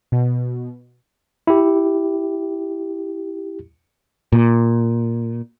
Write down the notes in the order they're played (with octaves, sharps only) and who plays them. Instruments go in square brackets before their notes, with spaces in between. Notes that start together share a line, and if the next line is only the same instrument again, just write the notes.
[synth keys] B2
[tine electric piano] E4 G4
[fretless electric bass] A#2